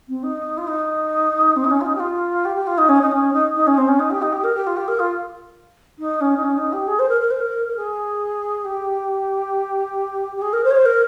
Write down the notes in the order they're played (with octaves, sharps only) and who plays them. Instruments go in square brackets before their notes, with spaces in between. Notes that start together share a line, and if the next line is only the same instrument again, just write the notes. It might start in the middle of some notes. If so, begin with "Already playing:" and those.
[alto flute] C4
D#4
F4
D#4
C4
D#4
C#4
F4
D#4
G4
F4
G4
G4
F4
D#4
C#4
D#4
C#4
D#4
D#4
C#4
C4
C#4
D#4
G4
D#4
G4
A#4
G4
F4
G4
A#4
F4
D#4
C#4
D#4
C#4
D#4
G4
G#4
C5
A#4
A#4
C5
A#4
A#4
G#4
G4
G4
G#4
A#4
C5
C#5
C5
A#4